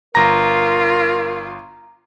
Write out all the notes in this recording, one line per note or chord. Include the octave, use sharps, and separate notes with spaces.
G1 F4 A#4 A#5 A#6